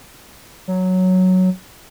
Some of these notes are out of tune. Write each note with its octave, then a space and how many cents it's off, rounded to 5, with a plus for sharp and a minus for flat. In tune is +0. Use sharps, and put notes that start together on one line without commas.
F#3 +0